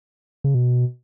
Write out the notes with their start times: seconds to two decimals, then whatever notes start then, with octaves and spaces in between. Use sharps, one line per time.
0.44 C#3
0.54 B2